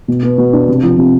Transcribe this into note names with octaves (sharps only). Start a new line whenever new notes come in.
B2
B3
B2
D4
C3
F3
C3